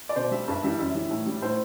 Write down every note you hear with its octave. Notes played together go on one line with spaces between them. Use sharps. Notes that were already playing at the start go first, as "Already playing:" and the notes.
D5
B2 C5
G3 E5
G2
E3 G3 E5
F#2 E5
E3 G3
A2
G3
A2 C5